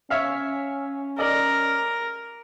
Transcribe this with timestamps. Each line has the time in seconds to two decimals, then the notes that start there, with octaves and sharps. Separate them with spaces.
0.10 C#4 C#5 E5 F5
1.18 A#4 D5 D#5